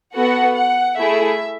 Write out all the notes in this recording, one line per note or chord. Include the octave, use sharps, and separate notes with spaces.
B3 F#4 A4 F#5
F#5
A3 E4 G#4 E5